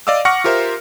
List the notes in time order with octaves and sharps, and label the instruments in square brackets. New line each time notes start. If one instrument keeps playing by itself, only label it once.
[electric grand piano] D5 D#5 F5 D6 E6
F#5 C#6 D6 F6 A#6 C#7
F4 G4 A#4 C5 E5